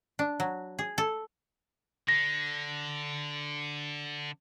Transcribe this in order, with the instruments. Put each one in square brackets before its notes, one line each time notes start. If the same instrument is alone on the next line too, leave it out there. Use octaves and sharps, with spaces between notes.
[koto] D4
F#3
G#4
A4
[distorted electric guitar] D3 [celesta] A#6